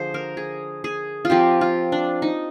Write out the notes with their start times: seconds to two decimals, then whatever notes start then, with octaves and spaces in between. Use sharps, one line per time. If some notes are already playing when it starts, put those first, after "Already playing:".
Already playing: D3 F3 D4 G#4 C5
0.14 A#4
0.37 G#4
0.84 G#4
1.25 F4
1.30 F3 C4 G4
1.61 F4
1.92 D4
2.22 D#4